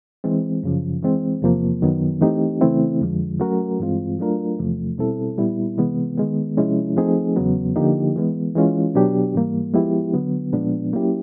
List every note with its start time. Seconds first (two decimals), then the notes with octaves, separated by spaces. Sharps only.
0.24 E3 G#3 C4
0.63 F#2 C#3 F3
1.02 E3 G#3 C4
1.42 E2 C3 F3 A#3
1.82 F#2 D#3 F#3 B3
2.21 E3 A3 C4 D#4 G4
2.61 C#3 E3 A3 C4 E4
3.01 F2 D3 F3 G#3
3.40 F#3 A3 C#4 F#4 A#4
3.80 G2 E3 G#3 C4 F4
4.19 F#3 A3 D4 F4 A#4
4.59 E2 C3 F3 A3
4.98 B2 G3 C4 E4 A4
5.38 A#2 G3 B3 E4
5.78 C3 E3 G#3 B3
6.18 D#3 G#3 B3
6.57 C3 F3 G#3 C#4 E4
6.97 F3 A3 C4 D#4 G#4
7.36 E2 C#3 F#3 B3
7.76 D3 F3 A#3 D#4 G4
8.16 E3 G#3 B3
8.55 E3 G#3 C#4 F4
8.95 B2 F#3 B3 D4 G4
9.34 G#2 E3 G3 A#3
9.74 F3 G#3 B3 E4 G4
10.14 D3 F#3 B3
10.53 A#2 F3 G#3 B3 D4
10.93 F#3 A#3 C#4 E4 G4